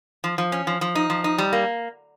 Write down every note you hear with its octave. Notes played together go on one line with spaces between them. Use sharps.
F3
F3
C#4
F3
F3
D#4
F3
D#4
G3
A#3